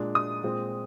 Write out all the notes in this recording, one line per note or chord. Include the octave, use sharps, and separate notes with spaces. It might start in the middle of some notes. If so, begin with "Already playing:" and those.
Already playing: A#2 G#3 D4
D#6
A#2 G#3 C4